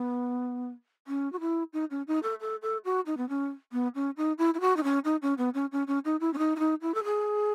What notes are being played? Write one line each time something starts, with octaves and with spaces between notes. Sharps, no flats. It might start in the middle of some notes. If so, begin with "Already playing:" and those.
Already playing: B3
C#4
F#4
E4
D#4
C#4
D#4
A4
A4
A4
F#4
D#4
B3
C#4
B3
C#4
D#4
E4
E4
F#4
D#4
C#4
D#4
C#4
B3
C#4
C#4
C#4
D#4
E4
C#4
D#4
E4
D#4
E4
A4
G#4